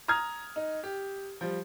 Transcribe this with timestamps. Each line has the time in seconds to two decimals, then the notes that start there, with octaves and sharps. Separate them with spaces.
0.08 A#5 D#6 F6 G#6
0.56 D#4
0.84 G4
1.41 F3 G3